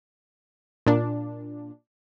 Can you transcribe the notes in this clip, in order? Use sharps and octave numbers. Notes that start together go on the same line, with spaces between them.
A#2 D4